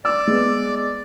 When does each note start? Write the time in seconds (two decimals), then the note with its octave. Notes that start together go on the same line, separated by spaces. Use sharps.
0.05 D5 D6 E6
0.27 G#3 B3